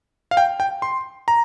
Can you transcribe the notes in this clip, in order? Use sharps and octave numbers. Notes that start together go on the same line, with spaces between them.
F5
G5
G5
C6
A#5